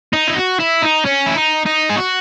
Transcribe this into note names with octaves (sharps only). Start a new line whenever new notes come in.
D#4
E4
F#4
E4
D#4
C#4
E4
D#4
D#4
G#4
F#4